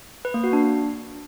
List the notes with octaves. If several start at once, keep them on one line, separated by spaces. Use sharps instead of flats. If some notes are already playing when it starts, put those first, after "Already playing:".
B4
A#3
F#4
D4